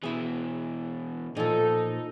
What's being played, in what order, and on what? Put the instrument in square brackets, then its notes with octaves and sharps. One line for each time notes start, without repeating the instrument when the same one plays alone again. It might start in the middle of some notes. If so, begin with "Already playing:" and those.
[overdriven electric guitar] B2 E3 [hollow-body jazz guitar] E4 G#4
[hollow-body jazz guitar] A#2 F3 [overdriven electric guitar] D#4 [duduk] A4